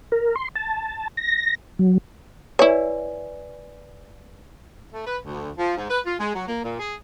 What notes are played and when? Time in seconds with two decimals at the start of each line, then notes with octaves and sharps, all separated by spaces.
0.12 A#4
0.36 C6
0.55 A5
1.17 A#6
1.79 F#3
2.59 E4 B4 C#5 D5 G#5
4.92 A3
5.06 B4
5.23 D2
5.58 F3
5.76 G#2
5.89 B4
6.06 F4
6.19 G#3
6.34 F#3
6.47 A#3
6.63 A#2
6.79 G#4